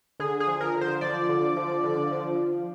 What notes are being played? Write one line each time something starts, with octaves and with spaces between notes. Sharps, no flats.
D3 G#4
G#4
F3
A#4
D3
C5
F3 D5
D3
F3
D3
F3